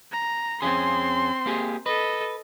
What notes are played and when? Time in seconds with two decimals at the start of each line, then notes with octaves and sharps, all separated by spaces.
0.12 A#5
0.62 F2 C4 C#4 G#4 C6
1.46 A#3 G4 G#4
1.86 A4 B4 D#5